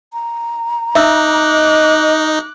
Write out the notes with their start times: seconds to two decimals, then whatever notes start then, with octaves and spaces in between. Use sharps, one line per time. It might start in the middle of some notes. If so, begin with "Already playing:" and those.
0.13 A#5
0.95 D#4 E5 D6 E6 F#6
1.50 D#5